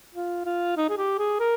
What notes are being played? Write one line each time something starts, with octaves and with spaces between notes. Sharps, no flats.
F4
F4
D#4
G#4
G4
G#4
A#4